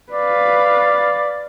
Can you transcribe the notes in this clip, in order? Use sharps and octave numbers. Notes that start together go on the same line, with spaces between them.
B4 D5 F5